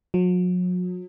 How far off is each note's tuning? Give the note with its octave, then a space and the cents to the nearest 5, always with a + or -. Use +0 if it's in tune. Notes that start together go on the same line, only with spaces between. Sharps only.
F#3 -40